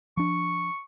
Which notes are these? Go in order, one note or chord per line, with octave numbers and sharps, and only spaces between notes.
F3 D4 C#6